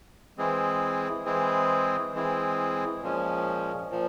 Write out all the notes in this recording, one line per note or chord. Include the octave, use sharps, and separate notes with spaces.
E3 G#3 C4 E4 G#4
E3 G#3 C4 E4 G#4
E3 G#3 C4 E4 G#4
A#2 F3 G#3 C#4
A#2 F3